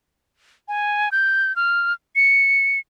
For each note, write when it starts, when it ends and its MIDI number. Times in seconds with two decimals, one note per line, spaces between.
0.68 1.09 80
1.12 1.55 91
1.56 1.93 89
2.16 2.79 97